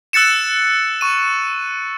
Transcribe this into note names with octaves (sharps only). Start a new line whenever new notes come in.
E6 F#6 A6 C#7 E7
C#6 D#7